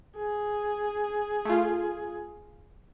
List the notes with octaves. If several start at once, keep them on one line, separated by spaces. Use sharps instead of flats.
G#4
A3 F4